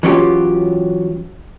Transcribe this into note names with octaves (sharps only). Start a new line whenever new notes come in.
E3 F#3 C#4 F4 G4